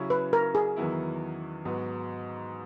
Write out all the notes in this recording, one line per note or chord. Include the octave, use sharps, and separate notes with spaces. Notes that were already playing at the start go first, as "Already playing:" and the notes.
Already playing: C#3 F#3 C#4 E4
B4
A#4
G#4
E2 D#3 F#3 B3 E4
G#2 F#3 B3